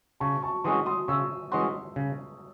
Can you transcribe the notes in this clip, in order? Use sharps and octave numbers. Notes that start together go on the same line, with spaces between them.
C#3 A5 C#6
A5 C#6
E3 G#3 C#4 F#4 C6 D#6
C6 D#6
C#3 C#6 E6
E3 G#3 C#4 F#4 C6 D#6
C#3